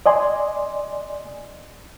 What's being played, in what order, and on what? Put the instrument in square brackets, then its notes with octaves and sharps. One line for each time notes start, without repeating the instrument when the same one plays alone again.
[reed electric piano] D5 D#5 G#5 C6